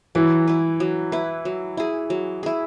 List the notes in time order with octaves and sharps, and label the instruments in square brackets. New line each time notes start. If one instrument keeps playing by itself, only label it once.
[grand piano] E3 [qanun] F#3
[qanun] E4 B4
F#3
E4 B4
F#3
E4 G#4
F#3
E4 G#4